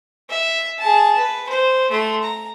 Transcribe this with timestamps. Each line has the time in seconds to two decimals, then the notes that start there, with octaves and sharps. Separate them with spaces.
0.30 E5
0.79 G#4 A5
1.18 B4
1.49 C5
1.90 A3 C6
2.23 A#5